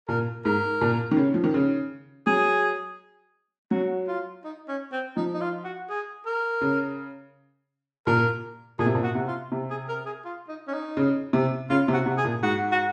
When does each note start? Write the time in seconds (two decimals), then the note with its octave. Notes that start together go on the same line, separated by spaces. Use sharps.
0.08 A#2 A#4
0.45 G#2 A#4
0.81 A#2
1.11 D#3
1.17 C#3
1.34 F3
1.44 D#3
1.54 C#3
2.27 F#3 G#4
3.71 F#3 F#4
4.08 F4
4.44 D#4
4.68 C#4
4.92 C4
5.17 F3 D#4
5.34 D#4
5.41 F4
5.64 F#4
5.90 G#4
6.26 A#4
6.61 C#3
8.06 A#2 A#4
8.79 A#2 G#4
8.86 C3
8.95 A#2
9.04 F#4
9.15 C3
9.27 F4
9.52 C3
9.70 G#4
9.89 A#4
10.06 G#4
10.25 F4
10.48 D#4
10.68 C#4
10.73 D#4
10.97 C#3
11.33 C3
11.70 C#3 F4
11.88 C3
11.93 F#4
12.06 C3
12.17 G#4
12.25 A#2
12.43 G#2 F#4
12.72 F#4